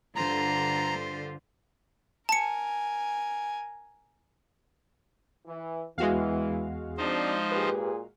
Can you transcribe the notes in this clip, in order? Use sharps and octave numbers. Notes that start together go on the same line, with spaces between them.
G2 D3 F4 C5 A#5
A#4 G#5 A5 C#7
E3
E2 E3 G#3 F#4 F5
F3 C4 D4 D#4 C5
A#2 G4 G#4 B4